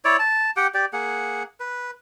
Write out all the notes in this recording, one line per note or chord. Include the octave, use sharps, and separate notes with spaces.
E4 C#5 D5
A5
G4 F#5 G5
G4 D5
A#3 G#4 F#5
B4